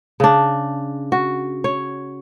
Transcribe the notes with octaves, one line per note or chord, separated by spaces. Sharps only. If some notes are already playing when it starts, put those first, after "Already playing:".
C#3 D4
F#4
C#5